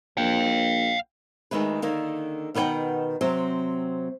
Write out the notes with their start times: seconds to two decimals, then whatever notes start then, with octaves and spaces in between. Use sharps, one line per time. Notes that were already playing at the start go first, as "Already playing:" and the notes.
0.17 A#1 F5 G5
1.51 D2 A#2 D#3 G#3 B4
1.82 D3 D#3 A#3
2.54 B2 D#3 B4 C#5 F#5 G5
3.21 C3 F#3 C4 C5